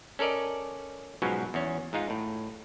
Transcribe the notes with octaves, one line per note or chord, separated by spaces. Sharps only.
C#4 A4 A#4 D5 D#5
G#2 B2 F3 F#3 C#4
E2 C#4
G#2 G#3 D#4 F4
A2